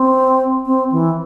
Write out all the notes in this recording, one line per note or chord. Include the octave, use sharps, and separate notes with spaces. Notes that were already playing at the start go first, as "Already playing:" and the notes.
Already playing: C4
C4
E3